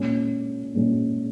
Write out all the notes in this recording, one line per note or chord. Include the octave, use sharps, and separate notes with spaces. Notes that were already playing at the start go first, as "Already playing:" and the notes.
Already playing: A#2 G#3 C#4
A#2 G#3 C#4